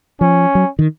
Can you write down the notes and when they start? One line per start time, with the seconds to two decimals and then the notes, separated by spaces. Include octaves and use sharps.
0.21 F3 C#4
0.55 F#3
0.79 D#3